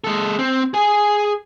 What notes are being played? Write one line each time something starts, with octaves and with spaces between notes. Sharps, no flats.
G#3 A4
C4
G#4 G#5